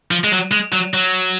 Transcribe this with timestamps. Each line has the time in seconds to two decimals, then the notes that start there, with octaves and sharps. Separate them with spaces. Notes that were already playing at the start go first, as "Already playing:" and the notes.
0.11 F3
0.24 G#3
0.31 F#3
0.52 G#3
0.73 F#3
0.94 F#3